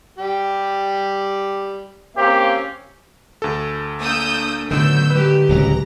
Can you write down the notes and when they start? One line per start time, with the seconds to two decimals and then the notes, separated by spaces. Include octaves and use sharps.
0.18 G3 G4
2.17 A#3 C4 C#4 G4 F5
3.42 D2 A4
4.00 A#3 D4 D#6 E6 G6
4.71 A2 D3 D#3 F#3 B3 E6 G6
5.10 G#2 G4 B4
5.49 D1 C#2 F#3 A#5